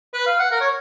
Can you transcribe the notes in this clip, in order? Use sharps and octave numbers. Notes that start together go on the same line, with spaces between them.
B4
F5
F#5
A#4
C#5